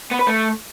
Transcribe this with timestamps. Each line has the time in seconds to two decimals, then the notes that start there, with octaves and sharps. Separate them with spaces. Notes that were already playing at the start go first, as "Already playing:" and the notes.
0.11 B3
0.19 B4
0.27 A3